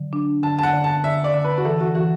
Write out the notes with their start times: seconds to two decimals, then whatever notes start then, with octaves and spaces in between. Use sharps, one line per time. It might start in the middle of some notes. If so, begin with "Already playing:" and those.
Already playing: D3 F#3
0.13 D4
0.43 D3 A5
0.59 A5
0.63 F#5
0.73 D3
0.84 A5
1.04 D3 E5
1.24 D5
1.34 D3
1.44 B4
1.58 F#4
1.65 E3 A4
1.81 F#4
1.95 E3 F#4